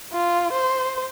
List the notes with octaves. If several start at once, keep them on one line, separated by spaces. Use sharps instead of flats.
F4
C5